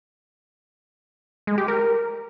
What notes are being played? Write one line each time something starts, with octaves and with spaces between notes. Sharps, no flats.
G#3
G4
A#4